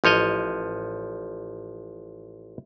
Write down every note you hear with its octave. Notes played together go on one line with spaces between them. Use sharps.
A1 F3 C#5 D#5